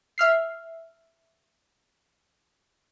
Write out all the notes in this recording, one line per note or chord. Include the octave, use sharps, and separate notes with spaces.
E5 F6 C7